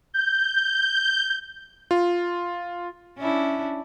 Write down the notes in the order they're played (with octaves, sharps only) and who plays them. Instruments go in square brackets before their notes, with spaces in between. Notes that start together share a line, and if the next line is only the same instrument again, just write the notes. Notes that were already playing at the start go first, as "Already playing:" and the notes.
[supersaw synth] G6
[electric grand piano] F4
[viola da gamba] C#4 D4 E4